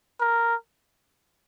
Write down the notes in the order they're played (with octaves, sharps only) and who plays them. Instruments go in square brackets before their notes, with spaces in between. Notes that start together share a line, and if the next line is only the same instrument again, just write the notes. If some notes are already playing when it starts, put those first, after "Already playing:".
[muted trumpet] A#4